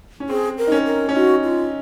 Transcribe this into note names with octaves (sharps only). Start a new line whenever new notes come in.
C#4
C4 G#4
A#4
D#4
C#4
A#4
C#4
D#4 F#4
F4